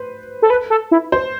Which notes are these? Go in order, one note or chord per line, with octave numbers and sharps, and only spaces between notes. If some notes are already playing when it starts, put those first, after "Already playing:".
Already playing: B4 C5
A4
B4
A4
E4
C5